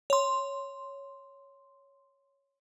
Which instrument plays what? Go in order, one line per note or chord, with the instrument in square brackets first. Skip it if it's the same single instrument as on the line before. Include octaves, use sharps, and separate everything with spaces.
[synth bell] C#5 C6